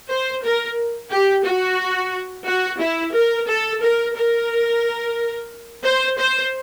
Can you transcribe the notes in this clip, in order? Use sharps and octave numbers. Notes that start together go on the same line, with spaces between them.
C5
A#4
G4
F#4
F#4
E4
A#4
A4
A#4
A#4
C5
C5